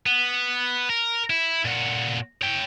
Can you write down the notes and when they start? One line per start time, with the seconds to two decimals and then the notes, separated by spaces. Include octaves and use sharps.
0.06 B3
0.90 A#4
1.30 E4
1.65 A#2 F#4
2.42 C#5 G5